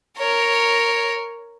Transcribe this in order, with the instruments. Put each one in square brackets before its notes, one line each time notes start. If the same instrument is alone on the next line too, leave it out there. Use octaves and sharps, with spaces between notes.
[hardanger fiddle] A#4 C#5